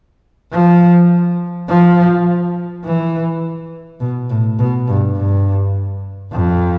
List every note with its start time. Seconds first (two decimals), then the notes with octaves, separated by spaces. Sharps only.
0.52 F3
1.68 F3
2.85 E3
4.00 B2
4.30 A2
4.59 B2
4.87 G2
5.17 G2
6.32 F2